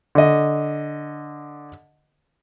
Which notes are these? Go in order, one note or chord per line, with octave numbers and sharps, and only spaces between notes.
D3 D#5